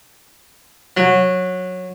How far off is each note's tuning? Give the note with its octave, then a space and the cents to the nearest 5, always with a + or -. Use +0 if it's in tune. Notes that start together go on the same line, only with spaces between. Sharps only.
F#3 -15